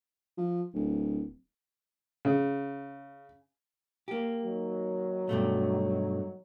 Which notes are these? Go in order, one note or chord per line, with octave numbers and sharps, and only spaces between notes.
F3
D1
C#3
A#3 G4
D#3 F#3
G2 B2 A3